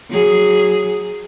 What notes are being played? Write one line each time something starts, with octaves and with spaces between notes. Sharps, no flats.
F#3 G#4